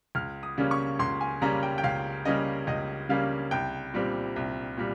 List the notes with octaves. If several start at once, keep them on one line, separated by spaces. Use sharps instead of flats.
C#2 F6
D#6
C#3 G3 A#3 C#4
C#6
C#2 C6
G#5
C#3 G3 A#3 C#4 A#5
G5
G5
C#2 F5
C#3 G3 A#3 C#4 D#5
C#2 D#5
C#3 G3 A#3 C#4 F5
C2 G5
A#2 G3 C4
C2
A#2 G3